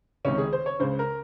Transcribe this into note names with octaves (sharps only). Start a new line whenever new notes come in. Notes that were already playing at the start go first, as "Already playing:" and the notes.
C#2 C3 D#3 C#4
G#4
C5
C#5
C#2 C#3 C5
A#4